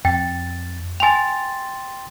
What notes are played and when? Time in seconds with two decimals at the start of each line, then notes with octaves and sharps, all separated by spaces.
0.05 F2 G5 A6
1.00 G5 G#5 C6 A6 F7